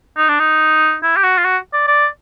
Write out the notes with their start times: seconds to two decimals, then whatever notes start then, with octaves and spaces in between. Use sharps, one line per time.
0.17 D#4
0.29 D4
0.39 D#4
1.03 E4
1.16 G4
1.24 F#4
1.38 F4
1.45 F#4
1.73 D5
1.88 D5